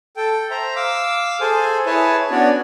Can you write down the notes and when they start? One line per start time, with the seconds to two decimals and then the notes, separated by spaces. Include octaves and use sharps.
0.17 A4 G5
0.51 C5 E5 A#5
0.76 F5 D6 E6
1.41 G#4 A4 C5 G#5
1.86 E4 G#4 B4 C#5 G#5 A5
2.31 B3 C#4 D4 F#4 C#5 D5